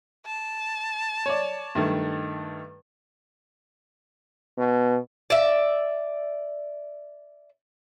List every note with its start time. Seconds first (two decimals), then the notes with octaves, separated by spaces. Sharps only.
0.26 A5
1.26 C#5 D5
1.75 G2 D#3 A3
4.58 B2
5.30 D5 E5